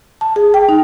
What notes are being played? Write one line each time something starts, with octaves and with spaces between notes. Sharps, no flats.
A5
G#4
G5
D#4